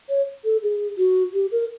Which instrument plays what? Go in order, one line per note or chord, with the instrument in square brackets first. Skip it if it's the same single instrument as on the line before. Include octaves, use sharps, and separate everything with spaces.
[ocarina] C#5
A4
G#4
F#4
G4
A#4